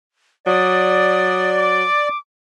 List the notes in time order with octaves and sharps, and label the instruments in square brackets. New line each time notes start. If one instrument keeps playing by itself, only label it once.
[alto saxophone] F#3 [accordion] D5 [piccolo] D#6
[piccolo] D6